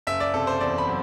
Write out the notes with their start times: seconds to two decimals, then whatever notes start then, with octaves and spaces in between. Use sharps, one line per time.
0.07 F#1 E5
0.20 D5
0.34 C3 A4
0.47 C5
0.61 E2 D5
0.78 B5
0.87 F#3